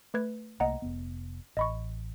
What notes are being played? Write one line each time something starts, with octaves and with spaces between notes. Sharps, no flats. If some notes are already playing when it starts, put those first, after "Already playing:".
A3 B4 G#6
C2 A3 A#3 D#5 F#5 A#5
F1 B3
A1 D#5 B5 C#6